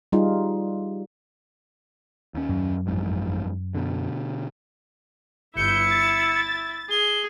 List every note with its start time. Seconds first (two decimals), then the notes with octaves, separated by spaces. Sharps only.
0.12 G3 D#4 F4 G#4
2.34 D#2 C#4
2.49 F#2 F#3
2.87 A1 F2 G#2
3.75 B2 D3
5.57 G1 E4 E5 G6 C#7
5.89 A6
6.91 G#4 G7